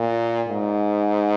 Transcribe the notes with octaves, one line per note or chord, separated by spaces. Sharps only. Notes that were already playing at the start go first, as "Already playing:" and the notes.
Already playing: A#2
G#2